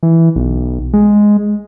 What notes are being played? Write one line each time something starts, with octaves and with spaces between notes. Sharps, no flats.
E3
B1
G#3